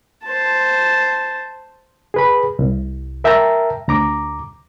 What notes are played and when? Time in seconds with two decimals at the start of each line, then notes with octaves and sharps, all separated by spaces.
0.25 C5 A5
2.14 G#4 B4 B5
2.59 C2
3.24 A#4 E5 G5 A5 A#5
3.88 D2 A#5 D6